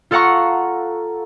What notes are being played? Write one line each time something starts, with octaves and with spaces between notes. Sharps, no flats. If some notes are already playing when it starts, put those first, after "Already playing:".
F4 A4 F5 F#5 A#5 C#6